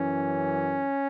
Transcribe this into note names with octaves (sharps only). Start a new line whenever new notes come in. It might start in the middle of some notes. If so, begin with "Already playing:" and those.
Already playing: F#2 E3 C#4